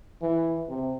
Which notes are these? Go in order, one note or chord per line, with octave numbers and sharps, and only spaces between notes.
E3
C3